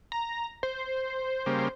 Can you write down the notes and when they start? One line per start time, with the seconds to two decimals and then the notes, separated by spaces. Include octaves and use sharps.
0.12 A#5
0.63 C5
1.46 C#3 G3 A#3